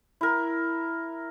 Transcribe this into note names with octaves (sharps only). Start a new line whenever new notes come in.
E4 A#4